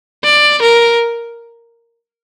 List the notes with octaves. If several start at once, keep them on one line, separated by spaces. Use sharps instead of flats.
D5
A#4